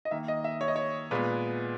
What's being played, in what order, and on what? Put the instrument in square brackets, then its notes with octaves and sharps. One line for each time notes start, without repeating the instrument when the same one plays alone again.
[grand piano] D#5
D#3 A#3 E5
D#5
E5
C#5
D#5
C#5
A#2 G#3 B3 B4